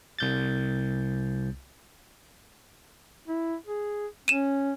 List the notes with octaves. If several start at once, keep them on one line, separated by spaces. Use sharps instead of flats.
C2 G6 A6
E4
G#4
C#4 D#7 E7